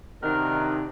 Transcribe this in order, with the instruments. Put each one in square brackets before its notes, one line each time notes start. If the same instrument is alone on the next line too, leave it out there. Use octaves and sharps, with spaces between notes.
[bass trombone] C3 [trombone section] D#3 [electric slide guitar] D4 D#4 F#4 [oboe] A#4